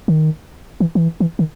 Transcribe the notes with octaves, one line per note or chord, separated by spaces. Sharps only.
D#3
E3
E3
E3
D#3